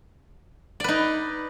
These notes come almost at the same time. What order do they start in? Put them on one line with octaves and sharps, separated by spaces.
D5 B4 D#4